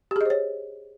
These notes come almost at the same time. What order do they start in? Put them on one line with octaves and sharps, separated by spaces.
G4 G#4 D#5 C5 C#5